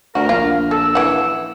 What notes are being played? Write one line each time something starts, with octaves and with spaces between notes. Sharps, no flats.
D2 F#4 A#4
A#1 F4
A4 E6
E3 F#5